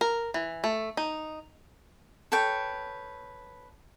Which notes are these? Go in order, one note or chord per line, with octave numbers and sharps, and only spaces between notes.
A#4
E3
A3
D#4
A4 B4 C#5 G5